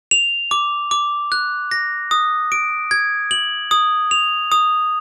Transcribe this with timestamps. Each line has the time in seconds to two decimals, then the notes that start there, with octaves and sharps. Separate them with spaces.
0.11 F7
0.51 D6
0.91 D6
1.32 F#6
1.71 A#6
2.11 D#6
2.52 D7
2.91 G#6
3.31 F#7
3.71 D#6
4.11 F7
4.52 D#6